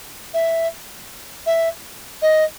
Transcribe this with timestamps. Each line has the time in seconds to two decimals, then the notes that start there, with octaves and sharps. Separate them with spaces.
0.34 E5
1.46 E5
2.22 D#5